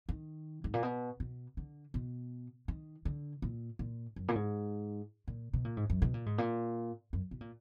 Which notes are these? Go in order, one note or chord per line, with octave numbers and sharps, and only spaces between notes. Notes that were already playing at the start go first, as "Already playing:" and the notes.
D#3
G#2
A#2
B2
B2
D3
B2
D#3
D3
A#2
A#2
F#2
A#2
G#2
A#2
B2
A#2
G#2
F#2
B2
A#2
G#2
A#2
F#2
B2
A#2